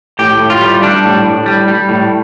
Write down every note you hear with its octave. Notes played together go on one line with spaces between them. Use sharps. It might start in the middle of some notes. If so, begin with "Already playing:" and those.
A2 G4
A2
F4
G3
G3 D4
A2
A2
G3
G3
A2